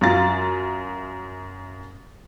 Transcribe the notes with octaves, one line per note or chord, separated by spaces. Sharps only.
F#2 F4 A6